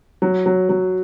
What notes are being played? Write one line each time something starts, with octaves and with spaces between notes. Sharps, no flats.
F#3
F#3
F#3